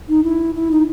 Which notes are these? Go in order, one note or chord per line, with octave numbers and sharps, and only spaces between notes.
D#4
E4
E4
D#4